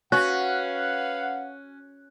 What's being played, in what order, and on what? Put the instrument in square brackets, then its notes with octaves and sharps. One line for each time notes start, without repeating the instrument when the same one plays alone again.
[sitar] C#4 [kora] F#4 [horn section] B4 F5 F#5 [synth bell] F#6